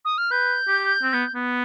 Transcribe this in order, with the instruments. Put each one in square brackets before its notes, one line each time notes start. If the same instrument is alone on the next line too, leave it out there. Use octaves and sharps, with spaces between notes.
[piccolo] D#6
F6
[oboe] B4 [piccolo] G6
[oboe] G4
C4
B3
B3